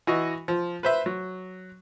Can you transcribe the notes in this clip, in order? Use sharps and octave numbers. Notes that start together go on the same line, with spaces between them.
E3 F#4 D#5
F3
B4 C5 E5
F#3